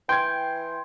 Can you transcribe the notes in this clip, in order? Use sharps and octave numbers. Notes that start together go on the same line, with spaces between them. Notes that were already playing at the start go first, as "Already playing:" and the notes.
E3 G5 C6 G#6